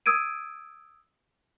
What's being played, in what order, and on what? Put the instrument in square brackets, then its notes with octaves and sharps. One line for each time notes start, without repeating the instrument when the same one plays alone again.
[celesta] D#6 E6 G#6 D7 D#7